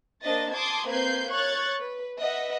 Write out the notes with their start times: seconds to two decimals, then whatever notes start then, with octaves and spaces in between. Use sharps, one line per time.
0.24 A#3 D4 C5 D#5 A6
0.54 A5 C6 D6 D#6 G#6
0.87 A#3 C4 B4 G6 G#6 C7
1.31 C#5 C#6 F#6 G#6 A6
1.80 B4
2.19 B4 D#5 E5 F#5